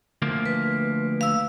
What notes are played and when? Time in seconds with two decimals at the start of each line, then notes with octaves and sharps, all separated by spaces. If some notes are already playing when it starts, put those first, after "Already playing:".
0.22 D2 F3 A#3
0.46 B4
1.21 F5 E6